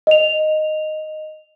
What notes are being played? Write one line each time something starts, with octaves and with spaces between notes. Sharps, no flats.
D#5 F7